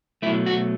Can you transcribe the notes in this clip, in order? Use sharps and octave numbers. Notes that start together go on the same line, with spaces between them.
B2 F#3 A3 E4
F#4